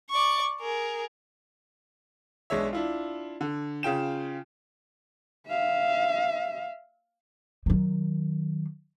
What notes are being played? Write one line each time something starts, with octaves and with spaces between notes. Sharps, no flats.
D5 C#6
G#4 A#4
B1 G#3 D4 C#5 E5
D4 E4 F4
D3
C#3 F4 G5 E7
E5 F5
D#3 F#3